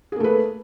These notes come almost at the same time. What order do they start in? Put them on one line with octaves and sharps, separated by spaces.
G#4 A#3 A3 B4